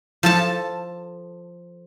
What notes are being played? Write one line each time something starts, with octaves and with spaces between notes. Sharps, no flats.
F3 A4 A5